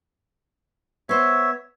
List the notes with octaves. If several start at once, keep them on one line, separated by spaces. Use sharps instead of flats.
B3 C5 C#5 E5